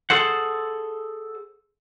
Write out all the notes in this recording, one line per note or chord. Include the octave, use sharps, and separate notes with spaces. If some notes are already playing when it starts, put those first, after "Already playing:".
G#4 A4 C5 F#5